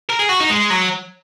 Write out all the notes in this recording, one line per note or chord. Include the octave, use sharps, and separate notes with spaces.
A#4
G#4
F#4
D#4
G#3
F#3